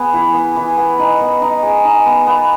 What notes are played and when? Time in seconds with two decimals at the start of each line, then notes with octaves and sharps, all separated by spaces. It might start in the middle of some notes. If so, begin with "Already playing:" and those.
Already playing: B3 G#4
0.13 E3
0.34 B3
0.56 E3
0.77 B3
0.99 D#4
1.21 B3
1.42 D#4
1.63 G#4
1.85 D#4
2.06 B3
2.27 B3